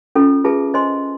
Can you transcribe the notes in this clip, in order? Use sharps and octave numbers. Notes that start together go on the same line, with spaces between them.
C#4 F4 A4
F4 G#4 B4 E5 A5
C5 D#5 G#5 C6